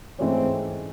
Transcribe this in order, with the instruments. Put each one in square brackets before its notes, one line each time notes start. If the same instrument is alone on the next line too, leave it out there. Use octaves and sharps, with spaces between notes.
[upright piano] G#2 E3 A3 C#4 [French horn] C4